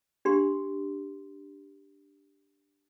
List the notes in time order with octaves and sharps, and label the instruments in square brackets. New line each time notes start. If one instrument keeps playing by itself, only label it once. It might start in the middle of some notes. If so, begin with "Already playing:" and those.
[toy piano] D4 G4 C6